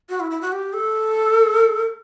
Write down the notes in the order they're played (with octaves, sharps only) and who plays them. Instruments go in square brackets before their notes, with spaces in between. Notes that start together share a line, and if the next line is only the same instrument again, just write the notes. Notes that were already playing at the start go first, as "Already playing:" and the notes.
[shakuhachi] F#4
E4
E4
F#4
G4
A4